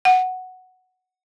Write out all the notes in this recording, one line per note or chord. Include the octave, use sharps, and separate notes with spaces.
F#5